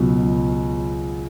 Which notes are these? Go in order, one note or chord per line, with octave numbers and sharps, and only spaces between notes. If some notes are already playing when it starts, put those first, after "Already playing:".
Already playing: C#2 B2 F#3